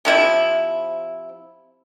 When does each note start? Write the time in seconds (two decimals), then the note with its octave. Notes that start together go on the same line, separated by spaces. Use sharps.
0.05 C3 F3 E4